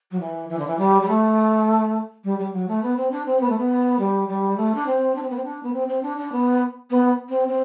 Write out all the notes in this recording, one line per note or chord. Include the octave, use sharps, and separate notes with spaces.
F#3
E3
E3
D3
E3
G3
G3
A3
G3
G3
F#3
A3
B3
C4
D4
C4
B3
A3
B3
G3
G3
A3
D4
C4
D4
C4
B3
C4
D4
B3
C4
C4
D4
D4
B3
B3
C4
C4